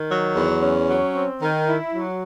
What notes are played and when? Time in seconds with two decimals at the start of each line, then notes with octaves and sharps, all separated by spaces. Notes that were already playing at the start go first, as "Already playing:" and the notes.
Already playing: D#3
0.10 F#3
0.35 E2
0.61 C#4
0.87 F#3
1.14 C4
1.41 D#3
1.67 E4
1.92 F#3